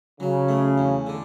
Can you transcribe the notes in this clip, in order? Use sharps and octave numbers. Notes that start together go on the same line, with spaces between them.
C#3 F#3
A3
E2
D3